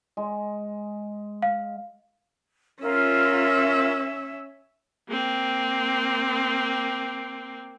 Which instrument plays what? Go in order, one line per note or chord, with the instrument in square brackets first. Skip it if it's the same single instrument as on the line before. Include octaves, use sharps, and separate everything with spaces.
[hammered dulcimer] G#3
[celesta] F5
[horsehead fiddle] C#4 E5 [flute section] F4 A#4
[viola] A#3 C4